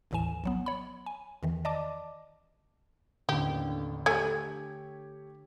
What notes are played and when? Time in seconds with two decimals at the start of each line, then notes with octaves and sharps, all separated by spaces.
0.11 G#1 D#2 A2 E3 G#5 E7
0.44 A#1 F#3 B3
0.66 C#5 B5
1.06 G#5
1.43 E2 D#3 E3
1.65 D5 D#5 A5 D6
3.29 A1 D#2 D3 G4
4.06 A3 G4 A4 C#5 G#5 G#6